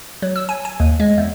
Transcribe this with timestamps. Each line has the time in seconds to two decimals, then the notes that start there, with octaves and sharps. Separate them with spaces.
0.22 F#3
0.36 E6
0.49 G#5
0.65 G#5
0.80 D#2
1.00 G#3
1.18 E2